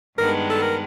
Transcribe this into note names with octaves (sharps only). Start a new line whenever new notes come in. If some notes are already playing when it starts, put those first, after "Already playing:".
G2 D#3 G#3 B3 D4 A#4
A4
A#4